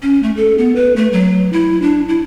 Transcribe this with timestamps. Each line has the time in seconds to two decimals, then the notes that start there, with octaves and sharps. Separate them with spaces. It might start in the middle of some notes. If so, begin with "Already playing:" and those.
0.02 C#4
0.23 A3
0.37 A4
0.58 B3
0.76 B4
0.96 A3
1.13 F#3
1.53 E4
1.82 D4
2.09 E4